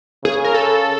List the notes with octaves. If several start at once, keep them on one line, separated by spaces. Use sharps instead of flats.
C#3 G#4
A#4
A4